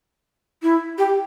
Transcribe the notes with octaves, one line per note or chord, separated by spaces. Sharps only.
E4
G4